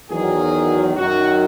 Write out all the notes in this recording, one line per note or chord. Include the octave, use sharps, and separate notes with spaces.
E2 D#3 F#3 G#4
F#2 D#3 F#3 F#4